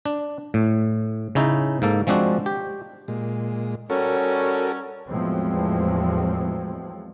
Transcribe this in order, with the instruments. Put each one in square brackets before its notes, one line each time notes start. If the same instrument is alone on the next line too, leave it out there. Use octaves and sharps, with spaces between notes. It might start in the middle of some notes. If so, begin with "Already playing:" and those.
[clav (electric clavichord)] D4
A2
C#3 C#4 D#4 E4
G#2 A#3 A4
F3 G#3 C4 D4 F#4
G4
[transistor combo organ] A#2 G#3
[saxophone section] G3 C#4 [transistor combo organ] F#4 A4 A#4
[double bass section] E2 A2 F3 F#3 G#3 C4